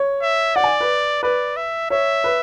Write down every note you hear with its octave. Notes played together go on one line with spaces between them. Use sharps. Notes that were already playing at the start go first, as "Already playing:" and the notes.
Already playing: C#5
E5
D5 F#5
G#5
B4
B4 D5
E5
C#5 E5
B4